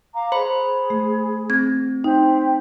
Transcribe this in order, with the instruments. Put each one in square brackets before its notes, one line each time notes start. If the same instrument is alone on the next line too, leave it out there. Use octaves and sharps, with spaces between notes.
[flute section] F5 A#5 D6
[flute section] G#4 [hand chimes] C5 B5
[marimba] A3
[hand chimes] C4 [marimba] G#6
[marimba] D#4 [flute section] C5 E5 G5